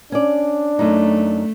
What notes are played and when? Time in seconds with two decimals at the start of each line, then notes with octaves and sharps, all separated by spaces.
0.12 C#4 D4 D5
0.79 F#2 A3 D#4